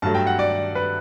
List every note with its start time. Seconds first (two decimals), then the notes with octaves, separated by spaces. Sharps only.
0.02 G2 F#3 A3 A5
0.15 G5
0.27 F#5
0.39 D5
0.75 B4